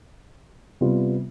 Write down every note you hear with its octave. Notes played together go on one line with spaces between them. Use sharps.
C3 G3 B3 F4